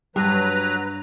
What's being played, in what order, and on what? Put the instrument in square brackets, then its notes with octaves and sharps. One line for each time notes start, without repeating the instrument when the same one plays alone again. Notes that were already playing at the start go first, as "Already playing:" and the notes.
[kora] G2 [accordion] F#3 B4 A#5